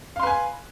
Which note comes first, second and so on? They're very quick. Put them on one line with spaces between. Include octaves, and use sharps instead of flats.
F5 C6 B4 G#5